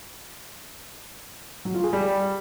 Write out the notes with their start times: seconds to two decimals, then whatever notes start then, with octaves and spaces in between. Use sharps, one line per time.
1.65 F#3
1.74 F4
1.84 G#4
1.93 G3